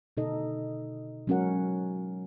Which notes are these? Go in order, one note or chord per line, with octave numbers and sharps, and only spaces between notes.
B2 D3 D#4 A4 D#5
F#3 G#3 C#4 F#4 A#4 F#5